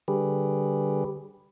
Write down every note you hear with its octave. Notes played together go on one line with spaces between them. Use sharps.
D3 G3 G4 G#4 B4